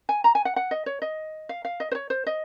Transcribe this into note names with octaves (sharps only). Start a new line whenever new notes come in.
G#5
A#5
G#5
F#5
F#5
D#5
C#5
D#5
F5
F5
D#5
C5
C#5
C5
D#5